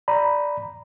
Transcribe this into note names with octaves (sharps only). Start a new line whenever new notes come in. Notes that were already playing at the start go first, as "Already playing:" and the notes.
D5 A#5 B5